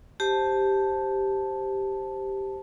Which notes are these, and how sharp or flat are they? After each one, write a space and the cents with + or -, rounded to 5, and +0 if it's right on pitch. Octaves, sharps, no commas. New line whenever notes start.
G4 +0 C5 +0 A5 +0